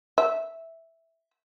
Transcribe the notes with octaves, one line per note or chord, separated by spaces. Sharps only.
E5